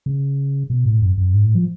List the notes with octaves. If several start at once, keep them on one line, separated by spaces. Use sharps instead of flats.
C#3
B2
A2
F#2
F#2
G#2
A2
F3